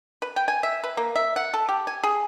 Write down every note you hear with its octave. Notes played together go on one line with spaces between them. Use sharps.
B4
G5
G#5
E5
B4
A#3
E5
F#5
A4
G4
G#5
G#4